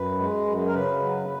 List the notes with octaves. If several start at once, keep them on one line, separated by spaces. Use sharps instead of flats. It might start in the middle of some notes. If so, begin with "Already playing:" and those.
Already playing: F#2 B4
G#3
F#2
A#4
C#3 B4
F#3